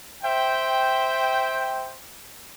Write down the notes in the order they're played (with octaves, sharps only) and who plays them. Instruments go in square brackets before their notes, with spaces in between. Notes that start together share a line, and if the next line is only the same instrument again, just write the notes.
[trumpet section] C5 E5 G5